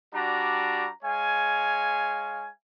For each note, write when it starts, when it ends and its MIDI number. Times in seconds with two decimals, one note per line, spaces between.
0.15 0.87 55
0.15 0.87 62
0.15 0.87 66
0.15 0.87 82
1.04 2.48 56
1.04 2.48 73
1.04 2.48 77
1.04 2.48 80